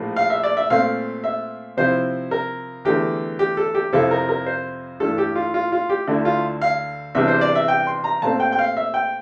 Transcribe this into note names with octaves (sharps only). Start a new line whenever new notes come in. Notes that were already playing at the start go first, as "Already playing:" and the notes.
Already playing: A#1 A2 F3 A#3
F5
E5
D5
E5
A#2 A3 C4 F5
E5
C3 F3 C4 E4 C5
A#4
E2 D3 A3 G4
G4
A4
G4
F2 C3 F3 C4 E4 A4
A#4
A#4
C5
G2 E3 A3 A4
G4
F4
F4
F4
G4
D2 D3 A3 E4
F4
F5
E2 C3 G3 D4 E5
C5
D5
E5
G5
C6
A#5
A#2 A3 C4 A5
G5
G5
F5
E5
G5